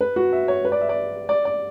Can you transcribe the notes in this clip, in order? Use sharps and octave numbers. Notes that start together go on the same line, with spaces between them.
B4
F#4
E5
C#5
B4
D5
E5
D5
D5
D5